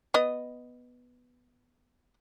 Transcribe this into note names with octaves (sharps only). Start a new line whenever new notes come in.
B3 D#5